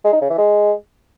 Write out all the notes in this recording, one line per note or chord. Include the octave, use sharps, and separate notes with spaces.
G#3
D#4
C#3
E3
G#3